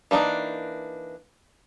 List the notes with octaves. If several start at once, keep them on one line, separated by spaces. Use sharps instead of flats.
E3 A#3 D4 D#4